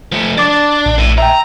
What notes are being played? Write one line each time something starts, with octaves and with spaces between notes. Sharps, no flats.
F3 A3
D4 D6 A6
A#1
A2
E5 G5 A#5